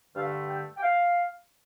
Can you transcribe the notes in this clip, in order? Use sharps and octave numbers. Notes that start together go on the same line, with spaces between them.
G2 D3 A3 F5
G5
G5
F5